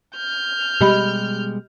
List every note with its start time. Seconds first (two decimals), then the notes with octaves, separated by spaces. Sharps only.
0.14 F6 G6
0.81 B2 G3 G#3 G4 D#5 B5